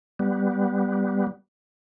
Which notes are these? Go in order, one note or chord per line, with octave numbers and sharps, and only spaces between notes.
G3 B3